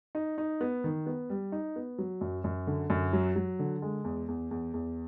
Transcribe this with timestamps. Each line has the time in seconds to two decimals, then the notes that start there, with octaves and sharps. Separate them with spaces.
0.15 D#4
0.38 D#4
0.61 B3
0.84 D#3
1.06 B3
1.30 G3
1.52 D#4
1.76 B3
1.98 F#3
2.21 F#2
2.44 F#2
2.67 D3
2.90 F#2
3.13 F#3
3.36 F#3
3.59 D3
3.82 G#3
4.04 E2
4.28 E2
4.51 E2
4.74 E2